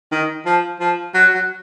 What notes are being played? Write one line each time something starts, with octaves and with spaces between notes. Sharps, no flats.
D#3
F3
F3
F#3
F#3